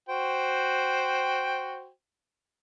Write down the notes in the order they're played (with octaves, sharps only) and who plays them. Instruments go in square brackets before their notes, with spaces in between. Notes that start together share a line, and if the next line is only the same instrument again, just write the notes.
[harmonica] F#4 C5 G5